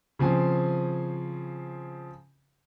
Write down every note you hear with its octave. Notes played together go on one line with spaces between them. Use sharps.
C#3 F3 C4 G#5